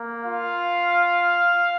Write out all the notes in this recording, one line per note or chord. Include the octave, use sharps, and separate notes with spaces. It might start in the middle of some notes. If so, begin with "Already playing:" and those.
Already playing: A#3
F4 F5